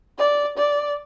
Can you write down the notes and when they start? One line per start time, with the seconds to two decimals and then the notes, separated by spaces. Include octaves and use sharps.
0.18 D5
0.57 D5